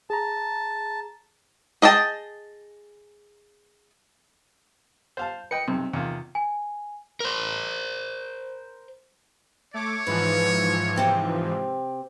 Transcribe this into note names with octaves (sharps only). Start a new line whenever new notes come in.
G#4 A5 A#5
G#4 D#5 G5 A5
C5 F5 A5
B4 D#5 G5 C#7
B1 C3 C4
E2 C3 D#3 F4
G#5
A#4 C5
A3 C#5 D6
G#2 E3 F3 B4
C3 C4 G4